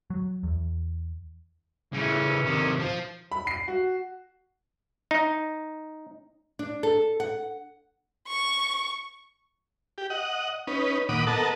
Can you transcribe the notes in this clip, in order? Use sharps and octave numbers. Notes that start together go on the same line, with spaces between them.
F#3
E2
C#3 E3 C#4
C3 D#3
F3
B5
C7
F#4
D#4
D4
A4
F#5
C#6
G4
D#5 F#5
C#4 D#4 B4
A#2 D#3 F#5 B5 D6 D#6
B3 A4 A#4 D#5 F#5 A5